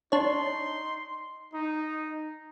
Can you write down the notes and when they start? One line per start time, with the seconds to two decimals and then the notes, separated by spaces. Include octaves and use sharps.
0.12 D4 D#4 C#5 C6
1.52 D#4